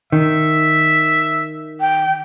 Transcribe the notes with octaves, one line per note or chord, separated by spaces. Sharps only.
D#3 E5
G5